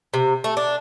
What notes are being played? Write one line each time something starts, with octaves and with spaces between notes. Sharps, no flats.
C3
A3
D4